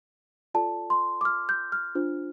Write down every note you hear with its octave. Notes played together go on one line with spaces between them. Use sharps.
F4 A4 D5 A5
C6
D6
F6
G6
F6
D4 F4 C5